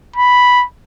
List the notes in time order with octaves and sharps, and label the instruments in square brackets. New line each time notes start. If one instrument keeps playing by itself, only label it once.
[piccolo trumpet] B5